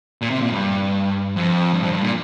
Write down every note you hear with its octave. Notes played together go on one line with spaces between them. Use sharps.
A#2
C3
A#2
G2
F2
G2
F2
G2
A#2